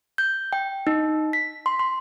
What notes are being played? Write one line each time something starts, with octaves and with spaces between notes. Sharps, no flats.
G6
G5
D#4
B6
C6
C6